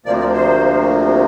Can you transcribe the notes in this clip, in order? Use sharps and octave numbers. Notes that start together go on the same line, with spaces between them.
D2 C3 F3 A#3 D5
D5
C5